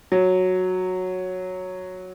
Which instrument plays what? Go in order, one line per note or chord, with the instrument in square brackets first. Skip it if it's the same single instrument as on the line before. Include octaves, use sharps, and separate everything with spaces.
[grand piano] F#3